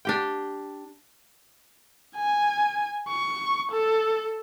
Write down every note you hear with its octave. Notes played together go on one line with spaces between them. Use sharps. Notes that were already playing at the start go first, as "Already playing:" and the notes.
D4 G4 G5
G#5
C#6
A4